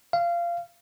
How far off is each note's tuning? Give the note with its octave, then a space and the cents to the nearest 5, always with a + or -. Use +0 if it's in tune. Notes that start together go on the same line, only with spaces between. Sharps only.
F5 -20